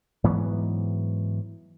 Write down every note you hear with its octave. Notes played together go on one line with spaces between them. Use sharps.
G#2 E3 F#3 B3